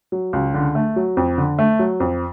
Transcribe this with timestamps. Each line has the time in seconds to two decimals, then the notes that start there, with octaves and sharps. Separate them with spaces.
0.12 F#3
0.33 C#2
0.54 D3
0.75 A3
0.96 F#3
1.17 F2
1.38 D3
1.59 A3
1.79 F#3
2.00 F2